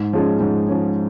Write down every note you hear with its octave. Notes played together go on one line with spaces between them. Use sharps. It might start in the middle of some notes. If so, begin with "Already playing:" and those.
Already playing: G#2
F3 G#3 C#4
G#2
F3 G#3 C#4